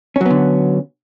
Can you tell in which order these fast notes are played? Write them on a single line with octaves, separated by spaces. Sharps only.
C#4 F#3 B3 D3